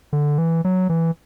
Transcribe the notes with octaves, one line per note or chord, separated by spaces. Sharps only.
D3
E3
F#3
E3